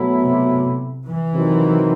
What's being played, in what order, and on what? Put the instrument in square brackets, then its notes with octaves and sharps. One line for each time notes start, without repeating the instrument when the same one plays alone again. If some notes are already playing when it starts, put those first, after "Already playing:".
Already playing: [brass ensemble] B2 F#3 A3 E4
[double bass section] C3
E3
[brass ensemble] C3 D#3 F#3 C4